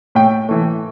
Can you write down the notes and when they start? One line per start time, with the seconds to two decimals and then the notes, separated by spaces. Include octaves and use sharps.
0.15 A2 G5
0.49 E3 A3